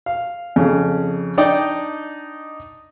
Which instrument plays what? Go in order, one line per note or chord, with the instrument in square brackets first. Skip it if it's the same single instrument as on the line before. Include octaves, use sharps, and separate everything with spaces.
[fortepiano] F5
F2 C#3
D4 D#4 D5 D#5 G5